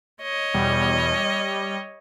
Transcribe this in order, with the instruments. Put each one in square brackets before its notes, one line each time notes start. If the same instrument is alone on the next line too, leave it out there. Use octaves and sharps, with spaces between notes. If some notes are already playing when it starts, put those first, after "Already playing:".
[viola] C#5 D#5
[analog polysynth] E2 B2 G3
G3